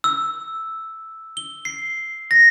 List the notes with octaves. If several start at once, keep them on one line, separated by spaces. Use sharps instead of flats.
E6
G7
C7
A#6